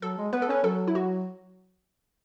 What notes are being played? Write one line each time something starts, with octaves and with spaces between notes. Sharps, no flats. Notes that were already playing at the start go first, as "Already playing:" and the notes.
F#3 A4
G#3
B3 B4
A4
C#4 B4
F#3 A4
E4
F#4